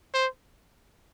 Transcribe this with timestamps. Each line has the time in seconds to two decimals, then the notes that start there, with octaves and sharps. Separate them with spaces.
0.14 C5